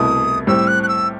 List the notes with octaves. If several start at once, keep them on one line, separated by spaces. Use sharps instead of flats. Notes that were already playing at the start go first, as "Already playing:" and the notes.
Already playing: C2 B2 A3 E4 D#6
A2 G3 C4 E6
F#6
F#6
E6